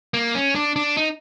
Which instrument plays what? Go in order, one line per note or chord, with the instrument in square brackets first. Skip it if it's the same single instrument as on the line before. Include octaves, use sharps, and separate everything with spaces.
[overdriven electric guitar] A#3
C#4
D4
D4
D#4